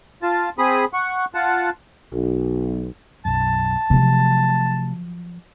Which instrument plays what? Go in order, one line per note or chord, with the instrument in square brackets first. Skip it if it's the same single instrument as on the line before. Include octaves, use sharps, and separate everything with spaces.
[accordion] F4 A5
C4 G#4 B5 D#6
F#5 C#6
F4 F#5 A5
[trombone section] B1
[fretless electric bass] B1 F#2 [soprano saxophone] A5
[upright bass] C3 A3 [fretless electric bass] F3 F#3